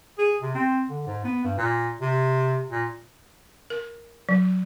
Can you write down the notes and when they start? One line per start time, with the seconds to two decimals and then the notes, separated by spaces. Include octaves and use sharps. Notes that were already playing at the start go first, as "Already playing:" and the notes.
0.18 G#4
0.41 C3
0.55 C4
0.90 D3
1.07 G#2
1.24 B3
1.44 G2
1.57 A#2
2.01 C3
2.71 A#2
3.70 A#4
4.29 F#3